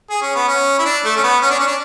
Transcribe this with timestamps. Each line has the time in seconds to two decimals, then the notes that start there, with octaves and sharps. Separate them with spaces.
0.10 G#4
0.22 C#4
0.35 B3
0.48 C#4
0.79 E4
0.85 D4
1.05 A3
1.16 C#4
1.23 B3
1.42 C#4
1.50 D4
1.59 C#4
1.67 D4